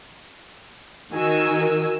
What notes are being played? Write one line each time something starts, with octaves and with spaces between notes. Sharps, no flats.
D#3 D#4 F#4 A#4 G#5 E6